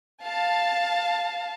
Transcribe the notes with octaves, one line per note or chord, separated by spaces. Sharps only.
F5 A5